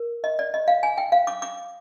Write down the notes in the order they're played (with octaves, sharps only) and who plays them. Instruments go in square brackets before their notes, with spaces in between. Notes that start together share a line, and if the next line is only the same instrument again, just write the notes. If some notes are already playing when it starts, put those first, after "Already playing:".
Already playing: [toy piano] A#4
D#5
D5
D#5
F5
G#5
G5
F5
D6
D6